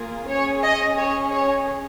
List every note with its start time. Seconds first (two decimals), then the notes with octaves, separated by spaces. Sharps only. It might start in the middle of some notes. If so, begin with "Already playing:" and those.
Already playing: A#3 F4 G#4
0.27 C#4 G#4 C#5
0.62 D#5
0.98 C#4 G#4 C#5
1.33 C#5